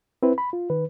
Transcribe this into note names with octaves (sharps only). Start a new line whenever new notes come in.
C4 E4 B4
B5
F4
D#3 B4